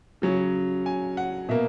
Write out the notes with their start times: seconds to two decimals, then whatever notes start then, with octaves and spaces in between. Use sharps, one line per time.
0.22 C#3 F#3 C#4
0.86 G#5
1.17 F#5
1.49 B2 A#3 E5